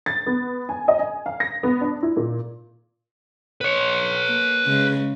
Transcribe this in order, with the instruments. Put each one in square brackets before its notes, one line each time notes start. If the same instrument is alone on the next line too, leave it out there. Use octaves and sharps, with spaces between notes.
[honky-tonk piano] A6
B3
G#5
D#5
G#5
F5
A#6
B3
D4
E4
A#2
[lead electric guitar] B4 C#5
[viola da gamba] A#3
C#3 G#3